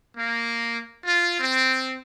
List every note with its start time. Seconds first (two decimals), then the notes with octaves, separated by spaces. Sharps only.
0.17 A#3
1.05 F4
1.40 C4